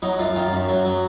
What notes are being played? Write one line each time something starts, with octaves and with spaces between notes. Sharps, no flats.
F#3 D#4
F#2 F4
D#3 F4
F#2
F#3
F#3